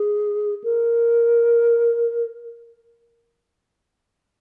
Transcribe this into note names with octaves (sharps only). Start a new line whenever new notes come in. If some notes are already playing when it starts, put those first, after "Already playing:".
Already playing: G#4
A#4